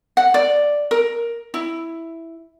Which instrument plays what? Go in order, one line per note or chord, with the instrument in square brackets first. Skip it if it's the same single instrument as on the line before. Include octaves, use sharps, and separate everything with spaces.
[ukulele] F#5
D5
A#4
E4